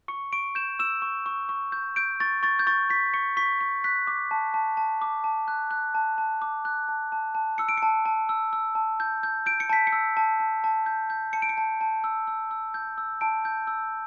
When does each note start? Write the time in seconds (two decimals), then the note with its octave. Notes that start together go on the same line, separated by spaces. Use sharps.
0.08 C#6 C#7
0.33 C#6 D7
0.55 G6 E7
0.79 E6 E7
1.02 C#6
1.26 C#6
1.49 C#6
1.72 G6
1.96 G6 D7
2.20 C#6 A6
2.43 C#6 A6
2.59 G6
2.67 C#6 A6
2.90 C#6 B6
3.14 C#6 C#7
3.37 C#6 B6
3.61 C#6
3.84 F#6 B6
4.07 D6
4.31 A5
4.54 A5
4.77 A5
5.02 D6
5.24 A5
5.48 F#6
5.71 F#6
5.95 A5
6.18 A5
6.42 D6
6.65 F#6
6.89 A5
7.12 A5
7.35 A5
7.58 E6 C#7
7.69 D7
7.77 C#7
7.83 A5
8.06 A5
8.29 E6
8.53 E6
8.75 A5
9.00 G6
9.23 G6
9.46 G6 D7
9.60 C#7
9.69 A5 B6
9.87 C#7
9.92 E6
10.17 A5
10.40 A5
10.64 A5
10.86 G6
11.10 G6
11.33 A5 C#7
11.42 D7
11.49 C#7
11.57 A5
11.81 A5
12.04 E6
12.27 E6
12.51 E6
12.74 G6
12.98 E6
13.21 A5 D7
13.45 G6
13.67 E6